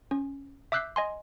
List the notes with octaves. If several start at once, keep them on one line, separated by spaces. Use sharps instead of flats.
C#4
E5 D6 E6 F#6 G6 C7
D#5 G#5 C6